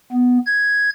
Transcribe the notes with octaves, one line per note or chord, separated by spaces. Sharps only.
B3
G#6